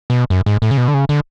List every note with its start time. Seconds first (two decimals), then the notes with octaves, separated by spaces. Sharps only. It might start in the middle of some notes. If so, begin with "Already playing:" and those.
0.10 B2
0.30 F#2
0.46 G#2
0.62 A2
0.71 C#3
0.77 B2
0.88 D3
0.94 C#3
1.09 D3